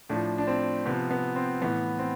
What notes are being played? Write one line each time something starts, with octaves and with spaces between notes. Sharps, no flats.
A2 F3 D4
D4
C4
C3 F3 B3
B3
C4
A2 E3 B3
C4